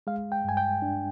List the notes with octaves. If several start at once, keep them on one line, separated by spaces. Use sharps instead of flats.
G#3 F5
G5
G2 G#5
G5
D4